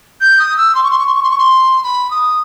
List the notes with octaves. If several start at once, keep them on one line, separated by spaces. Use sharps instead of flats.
G6
D#6
E6
C6
C#6
C6
C#6
C6
C#6
C6
C#6
C6
B5
D#6